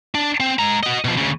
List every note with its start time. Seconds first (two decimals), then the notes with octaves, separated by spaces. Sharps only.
0.15 D4
0.40 C4
0.59 G#3 A#5
0.83 F#4 D#5
1.05 B2 F3
1.17 D2 C#3